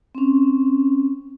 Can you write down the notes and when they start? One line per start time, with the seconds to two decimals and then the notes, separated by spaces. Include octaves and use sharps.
0.15 C4 C#4